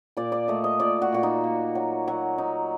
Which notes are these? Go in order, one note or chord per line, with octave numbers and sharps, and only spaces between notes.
A#2 D5
D5
A3 D#5
D#5
A#2 D5
F#4
A#2 F#4
D#4
A#3
F#3
F#3
D#4